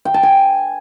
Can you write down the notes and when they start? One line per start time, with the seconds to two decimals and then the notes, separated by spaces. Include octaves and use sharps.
0.05 G5
0.14 A5
0.23 G#5